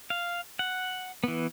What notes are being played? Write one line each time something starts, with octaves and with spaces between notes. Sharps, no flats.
F5
F#5
E3 B3